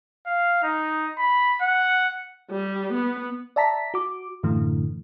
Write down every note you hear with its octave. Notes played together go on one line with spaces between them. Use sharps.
F5
D#4
B5
F#5
G3
B3
D5 E5 A5 A#5 B6
F#4 D6
F#2 A2 D3 E3 A3